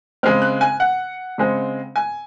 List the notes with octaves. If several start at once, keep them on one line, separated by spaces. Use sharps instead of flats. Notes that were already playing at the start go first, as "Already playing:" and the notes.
C#3 G#3 C4 F6
F#6
G#5
F#5
C#3 G#3 C4
G#5